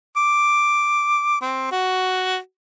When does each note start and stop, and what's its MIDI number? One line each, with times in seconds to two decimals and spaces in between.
0.17 1.38 86
1.41 1.67 60
1.72 2.37 66